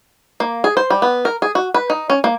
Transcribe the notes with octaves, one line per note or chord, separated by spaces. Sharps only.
A#3
G#4
C5
G3
B3
A#4
G#4
F#4
B4
D#4
C#4
A#3